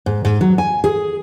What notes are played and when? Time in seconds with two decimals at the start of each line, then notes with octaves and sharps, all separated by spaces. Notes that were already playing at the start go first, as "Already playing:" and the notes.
0.06 G#2
0.25 G#2
0.41 F#3
0.58 G#5
0.84 G#4